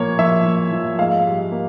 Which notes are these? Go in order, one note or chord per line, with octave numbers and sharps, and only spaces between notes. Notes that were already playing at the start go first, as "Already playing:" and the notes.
Already playing: A#2 F3 A#3 C#5
F3 E5
F3
F3
G#2 F5
G3
A#3